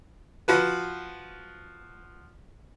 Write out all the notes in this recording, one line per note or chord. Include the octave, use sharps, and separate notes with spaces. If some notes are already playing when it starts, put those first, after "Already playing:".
F3 F#4 B4